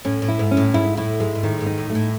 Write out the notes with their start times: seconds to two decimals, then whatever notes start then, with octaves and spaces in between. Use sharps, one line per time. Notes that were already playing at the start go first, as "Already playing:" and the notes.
0.05 A2 C#4
0.22 A2
0.28 E4
0.39 G#2
0.51 C#4
0.57 A2
0.74 G#2 E4
0.97 A2 E4
1.20 G#2 G#3
1.35 G#2
1.43 A2 D#3
1.61 G#2
1.66 D#4
1.78 A2
1.90 A3
1.95 A2